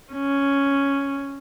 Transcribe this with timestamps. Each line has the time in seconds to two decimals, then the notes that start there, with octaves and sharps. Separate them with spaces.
0.13 C#4